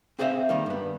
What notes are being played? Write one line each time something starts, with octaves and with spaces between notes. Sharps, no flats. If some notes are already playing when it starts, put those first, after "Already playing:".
C4 G#4 C5 D5 E5 F5
D#3 G3 A#3
G2 B3